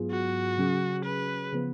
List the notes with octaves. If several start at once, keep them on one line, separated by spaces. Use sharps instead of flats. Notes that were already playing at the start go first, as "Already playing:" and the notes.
Already playing: G#2 F#3 B3 F4 G#4
F#4
C#3 F#3 C#4 G#4
B4
C#3 F3 B3